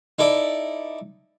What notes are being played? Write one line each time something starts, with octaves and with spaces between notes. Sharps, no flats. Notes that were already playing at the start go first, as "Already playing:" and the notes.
D#4 E4 A4 D5